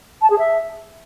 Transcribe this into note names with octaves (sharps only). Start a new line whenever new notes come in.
A5
G#4
E5